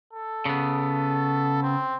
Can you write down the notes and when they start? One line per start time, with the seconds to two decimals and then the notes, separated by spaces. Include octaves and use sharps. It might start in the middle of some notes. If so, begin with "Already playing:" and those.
0.13 A4
0.45 C#3 B3
1.63 C4